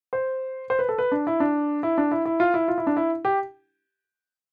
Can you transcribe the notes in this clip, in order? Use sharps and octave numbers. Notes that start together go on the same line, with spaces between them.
C5
C5
B4
A4
B4
D4
E4
D4
E4
D4
E4
E4
F4
E4
F4
E4
D4
E4
G4